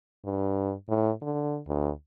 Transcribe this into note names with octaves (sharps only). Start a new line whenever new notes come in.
G2
A2
D3
D2